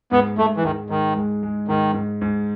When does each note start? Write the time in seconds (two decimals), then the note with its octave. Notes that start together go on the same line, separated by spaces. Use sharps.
0.11 G#2 B3
0.38 G#2 A3
0.57 E3
0.64 G#2 D#3
0.90 G#2 D#3
1.16 G#3
1.43 G#3
1.68 G#2 D#3
1.94 G#2
2.21 G#2